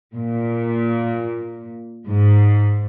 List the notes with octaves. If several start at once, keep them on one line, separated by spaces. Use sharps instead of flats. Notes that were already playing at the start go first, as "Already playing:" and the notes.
A#2
G#2